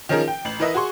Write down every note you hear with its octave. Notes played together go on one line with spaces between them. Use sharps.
D#3 F3 C#4 G#4 A#4
G5
A1 F#7
E3 A#4 B4 D#5 E5
F#4 G#4 C6 C#6